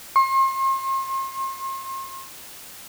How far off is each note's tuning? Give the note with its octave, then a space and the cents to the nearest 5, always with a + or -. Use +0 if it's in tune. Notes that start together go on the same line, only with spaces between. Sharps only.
C6 +40